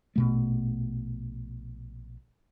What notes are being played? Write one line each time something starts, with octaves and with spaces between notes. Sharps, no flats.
A#1 B2 A3